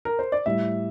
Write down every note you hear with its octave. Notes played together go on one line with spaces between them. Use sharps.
A#4
C5
D5
A2 G3 E5